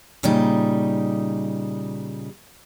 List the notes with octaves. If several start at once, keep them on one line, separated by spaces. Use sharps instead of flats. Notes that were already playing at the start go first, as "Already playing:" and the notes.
A#2 C#3 G3 D#4